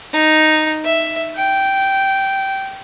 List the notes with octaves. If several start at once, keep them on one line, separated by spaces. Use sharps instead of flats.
D#4
E5
G5